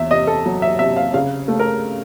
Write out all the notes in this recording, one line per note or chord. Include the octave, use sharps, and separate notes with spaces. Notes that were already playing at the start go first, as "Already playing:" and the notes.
Already playing: E2 E5
C3 D#5
A4
F#3
E5
C3 E5
F5
C#3 F5
A3
A#4